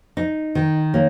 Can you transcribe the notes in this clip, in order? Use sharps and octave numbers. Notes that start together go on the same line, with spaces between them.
D#4
D#3
A#3 C#5